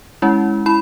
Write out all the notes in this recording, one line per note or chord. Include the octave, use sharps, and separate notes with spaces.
G#3 C#4 E4
E4 B5